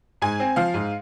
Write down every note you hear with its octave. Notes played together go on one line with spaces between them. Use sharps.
G#2 G#5
C4
F3 F5
G#2